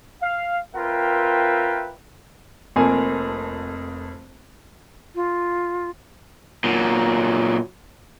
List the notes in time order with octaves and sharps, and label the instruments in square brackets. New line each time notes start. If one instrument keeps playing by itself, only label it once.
[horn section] F5
C4 F4 A#4 B4 E5 G5
[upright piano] F1 F2 A#3 G#5
[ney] F4
[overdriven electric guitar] A#2 F#3